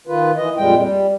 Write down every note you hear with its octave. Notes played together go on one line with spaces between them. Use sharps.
D#3 F4 B4
E3 D#5
F2 A#2 G3 G#3 G5
G3